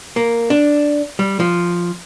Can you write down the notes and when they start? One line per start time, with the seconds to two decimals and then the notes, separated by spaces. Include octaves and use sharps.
0.16 A#3
0.50 D4
1.19 G3
1.40 F3